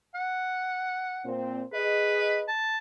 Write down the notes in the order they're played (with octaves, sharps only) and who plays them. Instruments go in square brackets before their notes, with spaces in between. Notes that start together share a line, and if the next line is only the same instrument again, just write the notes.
[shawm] F#5
[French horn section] A#2 C4
[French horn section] G#4 D#5 [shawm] B4
[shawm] A5